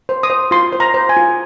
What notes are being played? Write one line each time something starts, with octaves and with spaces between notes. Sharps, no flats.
C5
D#6
C5
F4 C6
C5
A#5
C5
G#5
F4